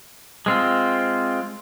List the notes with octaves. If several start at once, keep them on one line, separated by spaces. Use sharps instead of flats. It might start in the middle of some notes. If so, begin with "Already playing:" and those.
G#3 C4 F4